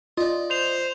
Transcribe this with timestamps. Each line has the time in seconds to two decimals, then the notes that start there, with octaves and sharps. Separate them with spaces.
0.18 F4 D5 D#5
0.51 C5 F7